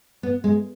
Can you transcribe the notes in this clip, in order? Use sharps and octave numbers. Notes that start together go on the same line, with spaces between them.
B3
G#3